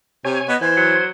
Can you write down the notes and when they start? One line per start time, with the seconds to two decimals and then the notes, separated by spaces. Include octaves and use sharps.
0.25 C3 C#5 G#5
0.48 B3 D#5
0.61 E3 C5 G#6
0.77 F#3